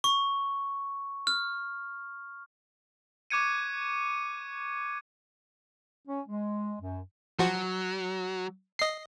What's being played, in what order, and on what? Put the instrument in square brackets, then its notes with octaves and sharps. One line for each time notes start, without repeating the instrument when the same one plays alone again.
[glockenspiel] C#6
F6
[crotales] C#6 D6 F#6 G#6 C#7 D#7
[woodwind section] C#4
G#3
F#2
[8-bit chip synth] F3 F#4 [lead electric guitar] F#3
[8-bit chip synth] D#5 C7